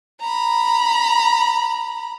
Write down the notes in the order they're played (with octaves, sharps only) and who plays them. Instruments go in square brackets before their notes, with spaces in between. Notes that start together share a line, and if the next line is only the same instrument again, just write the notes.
[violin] A#5 B5